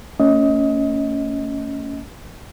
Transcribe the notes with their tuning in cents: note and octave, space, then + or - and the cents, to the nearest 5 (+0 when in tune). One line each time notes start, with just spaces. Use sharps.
A3 +45 C#4 +15 D#5 +25